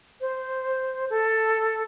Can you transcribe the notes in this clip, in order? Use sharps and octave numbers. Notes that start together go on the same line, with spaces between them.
C5
A4